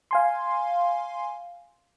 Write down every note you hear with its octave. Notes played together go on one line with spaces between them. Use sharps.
F5 G#5 C6